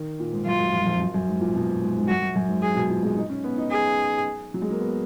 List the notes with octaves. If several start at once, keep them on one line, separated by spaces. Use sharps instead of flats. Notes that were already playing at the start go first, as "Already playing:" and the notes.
Already playing: D#3
A#2
G#2
F#2 F4
F#2
F2
F#2
F2
F#2
F#2
G#2
A#2
B2
G#2
G#2
F#2 F#4
F#2
F#2
G#2
G#4
B2
A#2
G#3
D#4
C#4
B3
D#4
G#4
F#3
G#3
A#3
B3